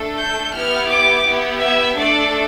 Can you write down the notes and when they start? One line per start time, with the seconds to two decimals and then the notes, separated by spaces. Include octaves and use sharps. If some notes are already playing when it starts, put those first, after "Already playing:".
Already playing: A3 D4 A4
0.18 G6
0.53 B3 E4 G4 F6
0.89 D6
1.25 B3 E4 G4
1.61 E5
1.96 A3 D4 A4 D5